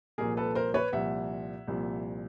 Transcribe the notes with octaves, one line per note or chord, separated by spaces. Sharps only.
C2 A#2 F3 G#4 A#4
A4 B4
A#4 C5
B4 C#5
C2 A#2 F3 E5 F#5
C2 A#2 F3